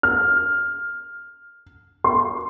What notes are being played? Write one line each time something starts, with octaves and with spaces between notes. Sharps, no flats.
F6
C6